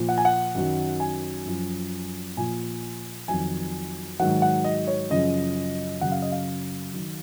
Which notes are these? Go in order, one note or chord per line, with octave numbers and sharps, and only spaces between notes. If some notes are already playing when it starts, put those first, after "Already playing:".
Already playing: A#2 F3
F#5
G#5
F#5
F#2 D#3 F#3
G#5
F#2 F3
A#2 F3 G#5
F2 D#3 F#3 G#5
G#2 D#3 F#3 F#5
F#5
D#5
C#5
F#2 C#3 F3 D#5
F#2 C#3 F#3 F#5
F5
D#5
F5
D#3 F#3